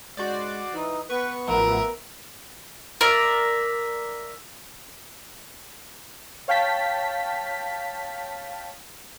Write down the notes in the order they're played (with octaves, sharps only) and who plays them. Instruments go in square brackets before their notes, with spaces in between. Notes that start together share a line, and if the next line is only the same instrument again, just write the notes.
[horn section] G#2 C#3 G#3 [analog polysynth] F#4 C5 D5
[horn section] E3 [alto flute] D#4
[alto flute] B3 [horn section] B4 [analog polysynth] C#6
[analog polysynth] A1 F3 [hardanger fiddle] A#4 [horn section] E5 F#5
[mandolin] A#4 D5 E5
[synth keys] C#5 F5 G5 A5 B6